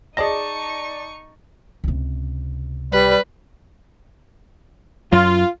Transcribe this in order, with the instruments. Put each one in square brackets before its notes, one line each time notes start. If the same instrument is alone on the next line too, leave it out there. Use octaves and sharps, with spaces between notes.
[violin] D#4 C#6 [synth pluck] G#4 D#5 [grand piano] D5 A5 A#6
[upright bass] C#2 C3
[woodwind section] G3 [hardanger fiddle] B4
[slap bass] F#2 F#3 [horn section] F4